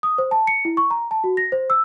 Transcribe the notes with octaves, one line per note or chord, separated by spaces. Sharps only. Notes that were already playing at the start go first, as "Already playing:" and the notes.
D#6
C5
A5
C#7
E4
C#6
A#5
A5
F#4
A#6
C5
E6